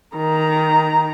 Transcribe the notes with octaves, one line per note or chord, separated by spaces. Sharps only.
D#3 A#5